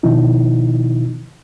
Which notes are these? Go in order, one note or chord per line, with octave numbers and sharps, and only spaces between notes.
B2 D#3 F3 D#4 E4